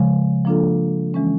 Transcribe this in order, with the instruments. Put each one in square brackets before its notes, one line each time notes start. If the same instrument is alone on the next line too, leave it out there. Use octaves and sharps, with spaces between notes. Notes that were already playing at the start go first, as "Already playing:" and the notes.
Already playing: [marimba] C#3 F3 G#3
F3 A#3 D4 F4 A4
E3 G#3 C#4